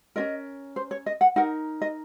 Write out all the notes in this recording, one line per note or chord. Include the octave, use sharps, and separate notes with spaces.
C#4 F4 A#4 D#5
C5
C#5
D#5
F#5
D#4 A#4 F#5
D#5